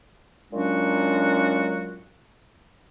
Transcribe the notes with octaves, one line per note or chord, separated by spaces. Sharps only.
A#2 F#3 G#3 C#4 D4 F#4